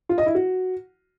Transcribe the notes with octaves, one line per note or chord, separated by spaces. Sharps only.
F4
D#5
E4
F#4